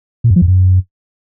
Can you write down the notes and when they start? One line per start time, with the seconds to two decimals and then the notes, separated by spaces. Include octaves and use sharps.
0.24 A#2
0.30 F#2
0.36 F3
0.42 F2
0.48 F#2